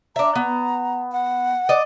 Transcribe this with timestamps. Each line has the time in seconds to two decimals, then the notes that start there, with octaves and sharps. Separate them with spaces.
0.16 D4 E5 A#5
0.35 B3
1.12 F#5
1.69 D5 D#5